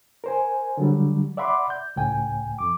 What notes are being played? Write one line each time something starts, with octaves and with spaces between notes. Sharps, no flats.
A#4 C5 G#5
D3 F#3 G3
D5 E5 F#5 B5 C6 D6
G6
C#2 A2 G5 G#5
F2 D6